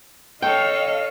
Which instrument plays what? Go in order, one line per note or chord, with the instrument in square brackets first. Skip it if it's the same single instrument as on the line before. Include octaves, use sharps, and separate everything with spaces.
[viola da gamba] A4 C#5 [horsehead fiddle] D#5 F5 [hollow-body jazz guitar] G5